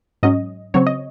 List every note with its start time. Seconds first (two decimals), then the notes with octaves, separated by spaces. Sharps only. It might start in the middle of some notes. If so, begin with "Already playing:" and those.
0.23 G#2 F#3 C#4 D#5
0.74 C#3 F#3 C4 C#5
0.87 D#5